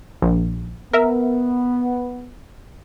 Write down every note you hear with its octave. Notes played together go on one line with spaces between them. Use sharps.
A#1
B3 A#4 E5